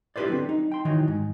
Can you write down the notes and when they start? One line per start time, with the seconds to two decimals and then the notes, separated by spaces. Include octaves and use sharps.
0.16 E4 G4 A4 B4 C5 D5
0.28 D3 F#3 C4
0.49 D#4
0.72 G5 C6
0.85 D#3 E3 F#3 D#4
1.08 G#2